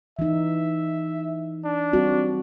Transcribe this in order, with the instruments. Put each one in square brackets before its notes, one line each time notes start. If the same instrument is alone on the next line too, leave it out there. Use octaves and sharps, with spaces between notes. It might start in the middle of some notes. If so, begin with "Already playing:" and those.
[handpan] E3 D#4 [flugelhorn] E5
[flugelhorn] D4
[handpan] G3 C4 F#4